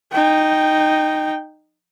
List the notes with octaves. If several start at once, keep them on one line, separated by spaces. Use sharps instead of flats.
D#4 G5